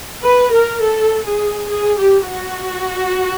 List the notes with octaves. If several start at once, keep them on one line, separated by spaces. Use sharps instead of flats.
B4
A#4
A4
G#4
G#4
G4
F#4